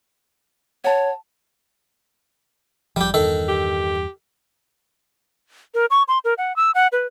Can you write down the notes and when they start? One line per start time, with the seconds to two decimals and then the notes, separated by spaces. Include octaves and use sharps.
0.84 C#5 F#5 A5
2.96 E1 A#1 F3 G3 G4
3.14 E2 G2 D#3 A4
3.49 G4
5.74 A#4
5.91 C#6
6.08 C6
6.25 A#4
6.38 F#5
6.56 E6
6.75 F#5
6.92 B4